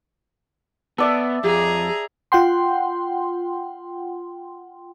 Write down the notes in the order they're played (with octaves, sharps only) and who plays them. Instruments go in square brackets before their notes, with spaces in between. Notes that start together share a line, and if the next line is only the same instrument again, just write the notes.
[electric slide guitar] B3 [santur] A4 D5 E5
[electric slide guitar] F2 [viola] G#4 A#5
[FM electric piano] F4 F#5 G5 C6